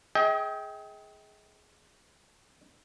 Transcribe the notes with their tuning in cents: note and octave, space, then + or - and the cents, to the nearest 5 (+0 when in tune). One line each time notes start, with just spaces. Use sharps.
G#4 +10 D#5 +40 G5 +0